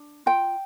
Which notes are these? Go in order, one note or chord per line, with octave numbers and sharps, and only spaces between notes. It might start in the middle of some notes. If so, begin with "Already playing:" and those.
Already playing: D4
F4 G5